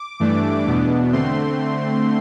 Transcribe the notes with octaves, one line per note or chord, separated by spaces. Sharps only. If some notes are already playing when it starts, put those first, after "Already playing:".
Already playing: D6
G2 E3 A3 D4
E2 B2 B3 D4
D3 A3 C4 C6